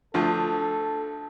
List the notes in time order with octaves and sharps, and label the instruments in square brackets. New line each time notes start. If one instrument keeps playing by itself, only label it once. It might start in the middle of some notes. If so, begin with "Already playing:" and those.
[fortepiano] D2 F3 [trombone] A4